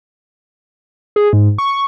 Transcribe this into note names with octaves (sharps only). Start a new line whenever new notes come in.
G#4
G#2
C#6